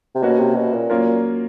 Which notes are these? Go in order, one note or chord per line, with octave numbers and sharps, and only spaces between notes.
C3
B2 A#3 C#4 F#4
C3
B2
A#2
F#3 A#3 C#4 F4 A#4